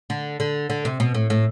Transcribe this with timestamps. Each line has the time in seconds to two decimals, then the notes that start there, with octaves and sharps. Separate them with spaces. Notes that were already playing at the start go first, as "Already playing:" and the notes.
0.10 D3
0.40 D3
0.70 D3
0.85 C3
1.00 B2
1.14 A2
1.30 A2